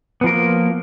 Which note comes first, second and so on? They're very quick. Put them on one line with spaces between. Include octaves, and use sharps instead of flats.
B3 F3 A#4 A#3